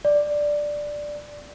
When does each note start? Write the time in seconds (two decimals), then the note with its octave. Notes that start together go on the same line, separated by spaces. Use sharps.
0.05 D5